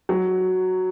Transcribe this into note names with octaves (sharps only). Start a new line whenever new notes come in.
F#3